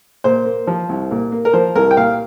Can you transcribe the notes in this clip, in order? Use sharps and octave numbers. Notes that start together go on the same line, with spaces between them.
A#2 C5
A#3
F3
C2
A#2
A#3
A#4
F3 C5
C2 A#4
G5
A#2 F5